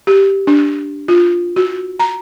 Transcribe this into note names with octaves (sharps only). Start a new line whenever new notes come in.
G4
D4
F4
F#4
A#5